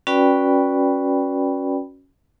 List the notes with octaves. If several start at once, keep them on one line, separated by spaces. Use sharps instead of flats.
C#4 F#4 B4 D5 G5 B5